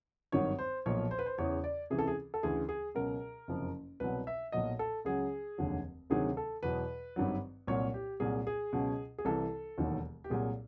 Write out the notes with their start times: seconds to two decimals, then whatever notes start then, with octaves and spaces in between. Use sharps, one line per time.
0.32 G#1 G2 D#3 F#3 C#5
0.59 C5
0.86 B1 A#2 F3 C#5
1.11 C5
1.19 B4
1.26 C5
1.38 E2 C#3 E3 C#5
1.64 D5
1.90 C#2 C3 E3 G#4
1.99 A4
2.07 G#4
2.34 A4
2.43 D2 C#3 E3 G#4
2.69 G#4
2.95 C#2 B2 F#3 A#4
3.48 F#1 F2 C3 F3
4.00 C2 B2 F#3 B4
4.27 E5
4.52 B1 A#2 F#3 D#5
4.79 A4
5.05 C#2 C#3 F#3 G#4
5.58 F1 D#2 D3 F#3
6.10 D2 C3 D#3 F#3 G#4
6.37 A4
6.62 E2 B2 F#3 B4
7.16 G#1 G2 D#3 F#3
7.67 C2 A#2 F#3 C#5
7.94 G4
8.20 C2 A#2 F#3 G#4
8.47 G#4
8.73 C#2 B2 F#3
9.18 G#4
9.25 C2 C3 E3 A4
9.78 E1 D#2 D#3 F#3
10.24 G4
10.30 C2 A#2 F#3 G#4